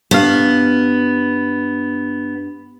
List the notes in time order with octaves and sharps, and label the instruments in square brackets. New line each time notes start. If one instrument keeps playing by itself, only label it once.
[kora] G2 F5 [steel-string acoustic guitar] B3